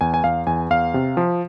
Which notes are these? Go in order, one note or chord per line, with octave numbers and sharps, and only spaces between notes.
E2 G#5
G#5
E2 F5
E2 G#5
E2 F5
C3
F3